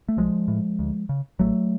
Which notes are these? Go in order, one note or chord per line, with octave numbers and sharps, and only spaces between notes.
A3
B1 F3 G#3
A2
D2
C#3
A1 F#3 A3